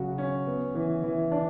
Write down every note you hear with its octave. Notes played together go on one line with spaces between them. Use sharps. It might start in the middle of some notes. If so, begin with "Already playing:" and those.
Already playing: C#3 F#3 F#4
C#4
B3
E3
E3
D4